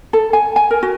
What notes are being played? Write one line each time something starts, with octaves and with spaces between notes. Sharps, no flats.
A4
G#5
G#5
A#4
F#4